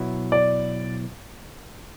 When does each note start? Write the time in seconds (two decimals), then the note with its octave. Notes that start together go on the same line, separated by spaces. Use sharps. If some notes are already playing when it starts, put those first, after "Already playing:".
Already playing: B2 F#3 B3 E4
0.32 D5